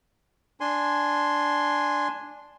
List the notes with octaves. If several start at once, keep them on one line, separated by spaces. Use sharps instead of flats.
D4 G#5 C6